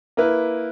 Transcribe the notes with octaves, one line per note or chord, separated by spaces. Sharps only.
A#3 E4 B4